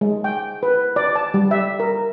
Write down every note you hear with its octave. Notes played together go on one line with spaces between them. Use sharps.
G#3
G5
B4
D5
A5
G3
E5
A#4